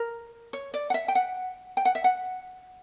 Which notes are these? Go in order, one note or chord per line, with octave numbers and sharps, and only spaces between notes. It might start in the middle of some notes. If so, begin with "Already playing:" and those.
Already playing: A#4
C#5
D5
F#5
E5
G5
F#5
G5
F#5
E5
F#5